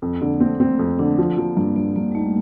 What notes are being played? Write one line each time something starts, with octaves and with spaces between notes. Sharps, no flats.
F2
D3 A#3
A3 C4
A3 C4
F2
D3 D4
F3
F3 A#3
G2 A#3
G2 A#3
G2 A#3
G3
A3 D#4